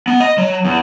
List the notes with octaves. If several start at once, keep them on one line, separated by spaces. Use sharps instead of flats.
B3
D#5
F#3
E2